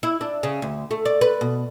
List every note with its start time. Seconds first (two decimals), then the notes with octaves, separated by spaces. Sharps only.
0.03 E4
0.21 D4
0.43 C#3
0.62 D2
0.91 A3
1.05 D5
1.21 B4
1.41 B2